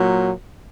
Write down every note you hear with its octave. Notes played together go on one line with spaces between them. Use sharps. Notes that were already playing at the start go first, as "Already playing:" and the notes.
Already playing: A#2 F#3